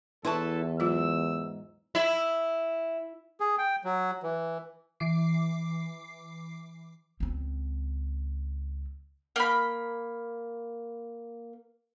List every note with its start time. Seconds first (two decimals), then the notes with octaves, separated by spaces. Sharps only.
0.25 E2 E4 A4 B4 A5 C6 C#6
0.80 G#2 F#3 F4 E6
1.95 E4
3.40 G#4
3.58 G5
3.84 F#3
4.23 E3
5.00 E3 D6 C7
7.20 C#2 C4
9.36 A#3 B5